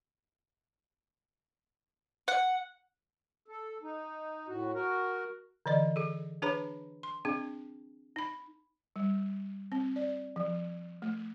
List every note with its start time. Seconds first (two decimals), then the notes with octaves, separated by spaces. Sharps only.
2.28 F#5
3.48 A4
3.83 D#4
4.48 A2 F#4
4.74 F#4 A#4
5.66 D3 E3 D5 D#5
5.96 G#4 A4
6.42 D4 G#4 B4 C#5 A#5 B5
7.03 C6
7.25 C4 D4 G#4
8.16 D#4 B5
8.96 G3
9.72 C4
9.96 D5
10.36 F3
11.02 A3